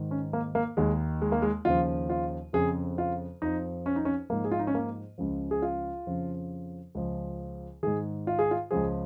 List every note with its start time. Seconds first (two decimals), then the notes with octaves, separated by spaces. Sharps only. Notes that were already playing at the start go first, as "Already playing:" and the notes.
Already playing: G#2 D#3
0.11 C#4
0.33 A#3
0.55 A#3
0.77 D#2 D#3 G#3
1.22 G#3
1.32 A#3
1.42 G#3
1.65 D#2 C#3 F3 F4
2.10 F4
2.53 F2 C#3 F3 G#4
2.98 F4
3.42 F2 F3 D#4
3.86 C#4
3.96 D#4
4.05 C#4
4.30 G#2 F3 A#3
4.44 G#4
4.51 F4
4.59 D#4
4.67 C#4
4.75 A#3
5.18 C#2 C#3 F3
5.51 G#4
5.62 F4
6.07 F2 C#3 F3
6.95 C#2 C#3 F3
7.83 G#2 D#3 G#4
8.27 F4
8.39 G#4
8.51 F4
8.71 C#2 C#3 F3 G#4